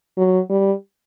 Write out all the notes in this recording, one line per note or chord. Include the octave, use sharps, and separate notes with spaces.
F#3
G3